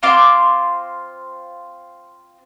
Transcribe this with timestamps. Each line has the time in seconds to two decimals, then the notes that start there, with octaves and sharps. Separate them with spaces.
0.03 C4 F4 C6 D6